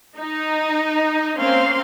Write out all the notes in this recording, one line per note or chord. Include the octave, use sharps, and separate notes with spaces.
D#4
A#3 C4 C#4 F5 C6